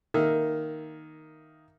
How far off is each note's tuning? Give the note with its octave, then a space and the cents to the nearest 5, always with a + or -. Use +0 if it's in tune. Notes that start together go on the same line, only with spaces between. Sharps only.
D#3 +0 A#3 +0 E5 +0